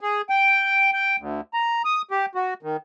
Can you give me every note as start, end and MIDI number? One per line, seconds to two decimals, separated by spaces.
0.01 0.22 68
0.30 0.91 79
0.93 1.16 79
1.19 1.41 38
1.54 1.82 82
1.85 2.02 87
2.11 2.26 67
2.35 2.54 66
2.63 2.77 51